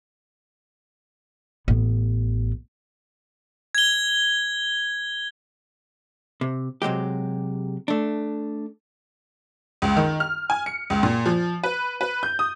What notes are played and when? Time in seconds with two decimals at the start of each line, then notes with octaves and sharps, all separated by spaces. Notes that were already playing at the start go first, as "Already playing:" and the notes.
1.68 A1 B3
3.75 G#6 G7
6.41 C3
6.82 C3 F#3 G#3 G4
7.88 A3 D4
9.82 C#2
9.97 D#3
10.20 F6
10.50 G#5
10.66 C#7
10.90 C#2
11.03 A#2
11.26 F3
11.63 B4
12.01 B4
12.23 G6
12.39 D#6